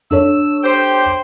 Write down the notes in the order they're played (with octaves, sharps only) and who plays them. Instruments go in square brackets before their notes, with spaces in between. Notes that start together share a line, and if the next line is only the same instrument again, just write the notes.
[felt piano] D4 A4 C#5 [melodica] E6
[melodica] G4 [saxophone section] C5 [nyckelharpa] G5 C6